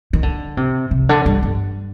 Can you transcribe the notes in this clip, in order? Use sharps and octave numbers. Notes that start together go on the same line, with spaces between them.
D#3
D3
C3
C3
D3
G2
G2